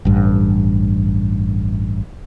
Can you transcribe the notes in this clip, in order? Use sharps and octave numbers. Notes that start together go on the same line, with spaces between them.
A1 G2